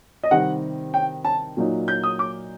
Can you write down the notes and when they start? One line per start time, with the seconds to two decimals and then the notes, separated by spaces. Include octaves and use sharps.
0.23 D#5
0.31 C3 D#3 G3 C4 F#5
0.94 G5
1.25 A5
1.57 A#2 F#3 A#3 D#4
1.88 G6
2.04 D#6
2.19 D6